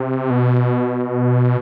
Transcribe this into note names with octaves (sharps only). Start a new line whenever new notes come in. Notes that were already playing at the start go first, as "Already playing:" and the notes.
Already playing: C3
B2